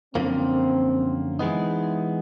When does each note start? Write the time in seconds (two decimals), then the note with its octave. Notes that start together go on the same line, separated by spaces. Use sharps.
0.15 F#2 D3 F3 A#3 C4
1.39 E3 G#3 B3 D#4